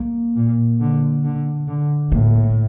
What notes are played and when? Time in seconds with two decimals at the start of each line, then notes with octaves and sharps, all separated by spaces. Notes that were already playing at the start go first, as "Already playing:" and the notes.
Already playing: A#3
0.36 A#2
0.80 D3
1.24 D3
1.68 D3
2.12 A2 A#3